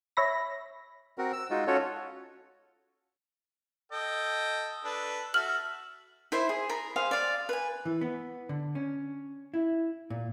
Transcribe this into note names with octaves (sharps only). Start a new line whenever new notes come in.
C#5 E5 B5 A#6
C4 F#4 A#4
E6
G#3 D#4 F4 F#4
C#4 F4 F#4 A4 C#5
A4 D#5 G5
D4 A4 B4
F#4 A4 E5 F6 F#7
E4 C5 E5
G#4
A#4 B5
G#4 C5 F5
D5 F5
B4 G#5
E3
B3
D3
C#4
E4
A#2